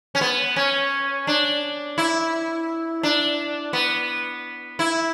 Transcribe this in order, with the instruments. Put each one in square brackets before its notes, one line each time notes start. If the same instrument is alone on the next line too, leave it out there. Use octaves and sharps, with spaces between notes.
[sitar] C#4
B3
C#4
D4
E4
D4
B3
E4